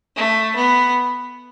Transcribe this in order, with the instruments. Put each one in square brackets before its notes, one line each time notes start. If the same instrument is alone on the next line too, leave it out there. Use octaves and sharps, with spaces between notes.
[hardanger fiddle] A3
B3